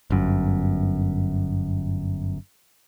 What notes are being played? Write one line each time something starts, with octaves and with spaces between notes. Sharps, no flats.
G1 F#2